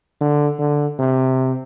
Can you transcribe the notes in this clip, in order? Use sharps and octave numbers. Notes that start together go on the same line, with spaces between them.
D3
D3
C3